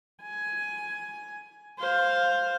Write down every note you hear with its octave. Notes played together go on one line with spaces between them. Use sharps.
G#5
C5 F5